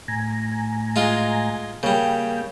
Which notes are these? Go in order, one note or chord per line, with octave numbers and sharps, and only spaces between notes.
A2 G#5 A#5
G#3 F4
C#3 G3 A#3 G5